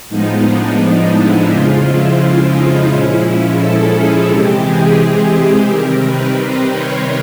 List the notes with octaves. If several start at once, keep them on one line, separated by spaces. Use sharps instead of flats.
A2 F3 G#3 B3 D#4
D4
D#4
E4
F2 C#3 F3 G#3 F4
E4
D#4
A#2 F3 G#3 C#4 E4
A4
G#4
C3 E3 G#3 C4 G4
G#4
G#4
G#4
C3 D#3 G3 C4 A#4
B4
C5
C#5